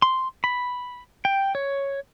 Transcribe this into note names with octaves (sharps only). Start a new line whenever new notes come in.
C6
B5
G5
C#5